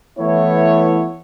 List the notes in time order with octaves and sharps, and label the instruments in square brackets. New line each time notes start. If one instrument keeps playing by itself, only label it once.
[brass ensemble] E3 A3 B3 E4 C#5